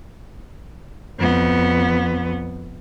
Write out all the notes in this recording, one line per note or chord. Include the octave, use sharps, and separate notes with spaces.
F2 B3